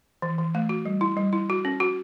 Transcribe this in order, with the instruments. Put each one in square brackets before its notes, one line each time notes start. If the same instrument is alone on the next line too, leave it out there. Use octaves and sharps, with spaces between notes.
[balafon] E3
E3
A3
F#4
G3
E4
G3
E4
F#4
C#4
F#4